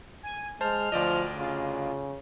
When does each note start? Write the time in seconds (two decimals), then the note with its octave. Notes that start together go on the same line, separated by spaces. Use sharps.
0.23 G#5
0.61 G#3 C5 A5 F6
0.92 D2 F3 D5 D#5
1.37 C#3 F4